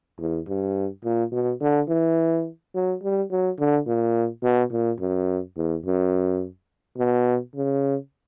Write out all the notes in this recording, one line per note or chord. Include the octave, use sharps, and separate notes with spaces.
E2
G2
A#2
B2
D3
E3
F#3
G3
F#3
D3
A#2
B2
A#2
F#2
E2
F#2
B2
C#3